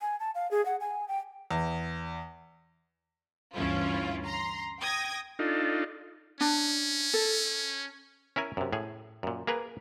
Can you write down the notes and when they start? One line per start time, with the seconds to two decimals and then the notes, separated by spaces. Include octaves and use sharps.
0.01 G#5
0.20 A5
0.35 F5
0.51 G#4
0.66 F#5
0.81 G#5
1.08 G5
1.51 E2
3.55 D2 G2 E3 C#4 E4 F4
4.25 A#5 C6
4.80 G5 D#6 G#6 A#6
5.39 D4 D#4 F4 A4
6.41 C#4 D4
7.14 A4
8.36 C#4 E4 A#4 G#5
8.57 F#2 C3
8.73 A2 G#4
9.23 F#2 A#2
9.47 A#3 G#4 A#4 B4